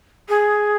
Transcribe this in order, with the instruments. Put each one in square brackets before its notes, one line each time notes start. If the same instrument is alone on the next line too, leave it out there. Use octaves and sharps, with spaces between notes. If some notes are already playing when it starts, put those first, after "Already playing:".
[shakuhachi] G#4